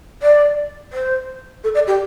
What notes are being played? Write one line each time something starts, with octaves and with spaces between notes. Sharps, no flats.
D5
C5
A4
D5
G4